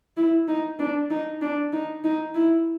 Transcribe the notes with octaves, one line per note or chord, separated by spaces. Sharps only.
E4
D#4
D4
D#4
D4
D#4
D#4
E4